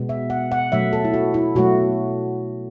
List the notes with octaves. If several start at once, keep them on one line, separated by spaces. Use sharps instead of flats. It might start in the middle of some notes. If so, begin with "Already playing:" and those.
Already playing: B2 G#3 B3
E5
F#5
F#5
B2 F#3 A3 E5
A4
E4
F#4
E4
B2 F#3 A3 F#4